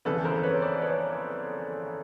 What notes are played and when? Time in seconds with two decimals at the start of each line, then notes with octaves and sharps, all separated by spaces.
0.05 G1 F2 C#3 E3 A4 B4
0.25 A#4 C5
0.43 B4 C#5
0.62 C5 D5
0.82 B4 C#5